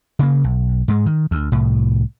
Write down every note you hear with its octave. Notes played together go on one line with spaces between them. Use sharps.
C#3 A#3
B1
G#2 G#3
D#3
D2
C2 A2